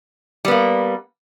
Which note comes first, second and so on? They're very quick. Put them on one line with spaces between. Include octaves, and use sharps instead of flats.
G3 B3 A#3